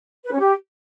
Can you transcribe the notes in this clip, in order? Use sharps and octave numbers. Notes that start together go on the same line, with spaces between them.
B4
C#4
G4